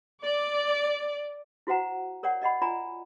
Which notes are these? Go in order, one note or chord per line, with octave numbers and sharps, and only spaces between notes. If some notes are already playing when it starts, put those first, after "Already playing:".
D5
E4 F#4 C5 F#5 A#5
A#4 C#5 D5 F#5
D5 D#5 F#5 B5
F4 D5 G#5 A#5 B5